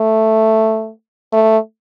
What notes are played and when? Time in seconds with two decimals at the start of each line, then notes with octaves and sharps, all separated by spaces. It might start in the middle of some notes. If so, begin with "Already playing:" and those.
Already playing: A3
1.32 A3